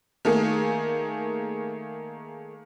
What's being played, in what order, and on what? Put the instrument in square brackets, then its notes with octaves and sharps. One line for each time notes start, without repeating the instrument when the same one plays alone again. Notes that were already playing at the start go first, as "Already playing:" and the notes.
[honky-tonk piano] D#3 A3 A#3 G#4